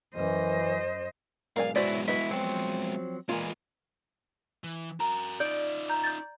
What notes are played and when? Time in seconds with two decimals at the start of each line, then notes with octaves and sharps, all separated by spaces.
0.14 F#2 E3 C5 D#5
1.56 B1 G#2 A#4 D5 F5 G#5
1.76 F#3 G#3 B3 E4 F#4 C5 D5
2.08 E4 F#4 B4 D#5
2.31 F3 F#3 C4
3.29 A#2 E3 G#3 A#3 F4
4.64 E3
5.00 F#4 A#4 A#5
5.40 D#4 F4 D5 G6
5.90 A#5 G6
6.03 G6 A6